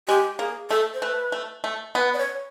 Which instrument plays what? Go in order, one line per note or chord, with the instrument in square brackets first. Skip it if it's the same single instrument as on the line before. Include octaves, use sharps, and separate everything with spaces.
[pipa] G#3 [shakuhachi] G4
[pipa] A#3 [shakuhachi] G#4
[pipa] A3 [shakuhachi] A4
[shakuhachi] C5
[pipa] A3 [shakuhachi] B4
[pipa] A3
A3
[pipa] B3 [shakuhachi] B4
[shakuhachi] D5
C#5